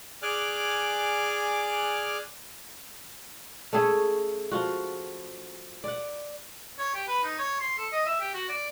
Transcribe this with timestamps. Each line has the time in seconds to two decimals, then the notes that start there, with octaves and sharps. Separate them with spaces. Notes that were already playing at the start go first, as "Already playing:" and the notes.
0.22 G#4 D5 G#5 D6 F6 F#6
3.73 A3 C#4 G#4 A4
4.51 F3 F4 F#4
5.84 D5 F#5
6.78 C#5
6.94 G4
7.07 B4
7.24 D#4
7.39 C#5
7.60 C6
7.78 A4
7.92 D#5
8.06 E5
8.20 G4
8.34 F#4
8.49 D5